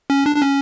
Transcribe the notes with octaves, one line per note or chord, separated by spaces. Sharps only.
C#4
D4
D4
C#4